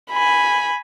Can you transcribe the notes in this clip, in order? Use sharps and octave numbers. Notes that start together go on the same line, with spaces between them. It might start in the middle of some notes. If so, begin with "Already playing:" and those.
G#5 B5